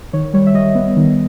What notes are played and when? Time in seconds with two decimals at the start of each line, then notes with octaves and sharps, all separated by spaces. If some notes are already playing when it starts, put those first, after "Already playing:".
0.13 D#3 C#5
0.34 G3 C#5
0.47 E5
0.54 G3 D#5
0.75 B3
0.96 D#3